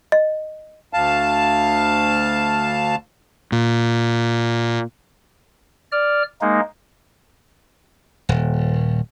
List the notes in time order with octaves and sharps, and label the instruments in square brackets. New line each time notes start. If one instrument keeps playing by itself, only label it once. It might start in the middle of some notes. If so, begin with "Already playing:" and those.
[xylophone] D#5
[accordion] D2 F5 A5
[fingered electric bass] A#2
[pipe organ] D5 F6
G#3 A#3 D#4
[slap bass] D#1